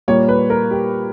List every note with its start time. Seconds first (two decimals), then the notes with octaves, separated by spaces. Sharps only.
0.08 A#2 G3 A#3 C#5
0.28 B4
0.50 A#4
0.71 G4